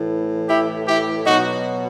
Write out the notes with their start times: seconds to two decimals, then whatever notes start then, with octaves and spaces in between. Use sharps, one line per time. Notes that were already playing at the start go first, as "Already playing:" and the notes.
Already playing: A2 E3
0.48 E4 G4
0.87 E4 G4
1.25 B2 F#3 D#4 F#4